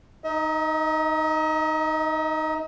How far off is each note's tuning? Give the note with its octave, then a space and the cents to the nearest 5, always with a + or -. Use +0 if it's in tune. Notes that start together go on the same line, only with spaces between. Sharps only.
D#4 +0 D#5 +45